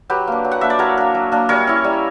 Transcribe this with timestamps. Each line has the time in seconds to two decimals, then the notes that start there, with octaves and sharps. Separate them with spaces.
0.10 F#3 G4 B4
0.27 A#3 D4
0.44 F#3
0.52 F#5
0.61 A#3 D4 E5
0.70 D5
0.79 F#3 A#4 C#5
0.97 A#3 D4
1.14 F#3
1.32 A#3 D4
1.49 G3 A#4 C#5
1.67 C#4 E4
1.84 G3